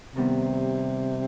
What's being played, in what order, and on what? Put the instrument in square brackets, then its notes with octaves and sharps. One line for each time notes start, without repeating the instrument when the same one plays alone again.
[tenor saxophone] C3 [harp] D#3 G3 B3